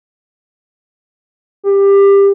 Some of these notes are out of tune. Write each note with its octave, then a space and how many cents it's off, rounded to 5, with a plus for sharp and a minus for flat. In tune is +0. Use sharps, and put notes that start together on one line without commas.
G4 +20